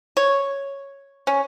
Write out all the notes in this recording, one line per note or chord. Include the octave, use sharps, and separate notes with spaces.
C#5
C#4